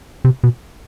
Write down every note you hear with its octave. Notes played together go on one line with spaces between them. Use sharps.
C3
B2